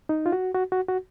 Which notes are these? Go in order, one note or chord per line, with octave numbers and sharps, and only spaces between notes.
D#4
F4
F#4
F#4
F#4
F#4